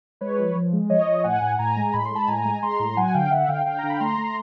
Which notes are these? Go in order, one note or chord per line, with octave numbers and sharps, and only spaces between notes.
G#3 B4 C#5
F3
F3
G#3
F3 C#5 D#5
F3
A2 F#5 G#5
A2
A2 G#5 A#5
G#3
A2 B5
C6
G#3 A5 B5
A2 G#5 A#5
G#3
G#3 A#5 C6
A2
F#3 F#5 G#5
D3 F5 G5
D3 E5 F#5
D3 F5 G5
D3 F5 G5
D3 A#5
B5
A3 A#5 C6
A3